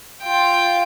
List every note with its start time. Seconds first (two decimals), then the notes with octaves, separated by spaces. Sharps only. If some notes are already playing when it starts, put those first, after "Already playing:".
0.22 F4 G5